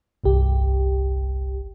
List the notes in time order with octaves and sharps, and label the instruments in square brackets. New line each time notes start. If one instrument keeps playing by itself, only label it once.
[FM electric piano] G1 C2 G4